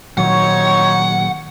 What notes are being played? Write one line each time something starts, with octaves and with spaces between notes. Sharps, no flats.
A#2 D#3 F#3 C4 D#4 C#5 F#5